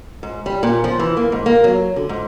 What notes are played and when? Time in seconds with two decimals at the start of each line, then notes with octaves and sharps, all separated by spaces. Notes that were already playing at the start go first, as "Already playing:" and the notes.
0.23 G#2
0.46 G3
0.63 A#2
0.84 F3
0.99 E3
1.17 A#3
1.32 G#2
1.46 A#3
1.64 F#3
1.96 D3
2.09 G#2